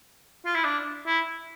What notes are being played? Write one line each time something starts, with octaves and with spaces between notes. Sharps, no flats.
F4
E4
D4
E4